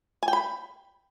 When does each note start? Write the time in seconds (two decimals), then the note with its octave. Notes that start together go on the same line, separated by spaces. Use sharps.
0.23 G#5
0.28 G5
0.33 B5